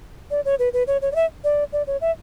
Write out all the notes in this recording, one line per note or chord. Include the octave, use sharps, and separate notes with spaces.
D5
C#5
B4
B4
C#5
C#5
D5
E5
D5
D5
C#5
E5